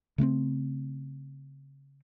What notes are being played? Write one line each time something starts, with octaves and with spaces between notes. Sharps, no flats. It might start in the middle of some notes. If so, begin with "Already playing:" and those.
C#3 A3 A#3 C4